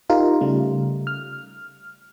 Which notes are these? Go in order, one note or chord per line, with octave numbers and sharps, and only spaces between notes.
D#4 F4 G4 A#4
C#3 G3 A3
F6